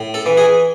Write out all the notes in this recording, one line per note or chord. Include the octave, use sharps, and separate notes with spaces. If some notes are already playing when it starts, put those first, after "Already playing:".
Already playing: A2
A4
E3
G#4